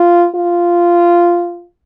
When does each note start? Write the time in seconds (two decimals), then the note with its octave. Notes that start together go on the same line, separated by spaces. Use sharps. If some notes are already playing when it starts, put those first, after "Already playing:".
Already playing: F4
0.35 F4